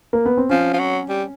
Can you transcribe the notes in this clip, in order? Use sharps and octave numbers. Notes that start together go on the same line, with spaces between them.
A#3
B3
C4
F3 C#4
F3
F#3
G3